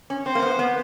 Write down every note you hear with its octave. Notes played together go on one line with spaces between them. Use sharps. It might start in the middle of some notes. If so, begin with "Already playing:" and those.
C#4
C4 C5
A#3
B3
B3